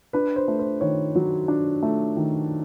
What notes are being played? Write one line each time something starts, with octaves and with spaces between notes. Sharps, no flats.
D4 B4
C5
A3
C5
D#3 C#5
F#3
D4
A3
D#3